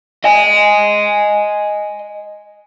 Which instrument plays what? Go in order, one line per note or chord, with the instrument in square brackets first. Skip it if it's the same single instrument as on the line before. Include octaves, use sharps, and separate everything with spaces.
[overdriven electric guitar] D#5 G#5